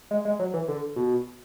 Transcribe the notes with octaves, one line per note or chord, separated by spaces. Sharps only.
G#3
G#3
F#3
E3
D3
B2